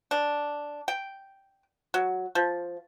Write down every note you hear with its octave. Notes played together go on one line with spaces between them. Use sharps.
D4
G5
F#3
F3